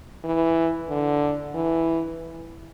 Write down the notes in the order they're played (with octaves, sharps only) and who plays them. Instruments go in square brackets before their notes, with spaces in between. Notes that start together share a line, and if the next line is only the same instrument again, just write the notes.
[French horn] E3
D3
E3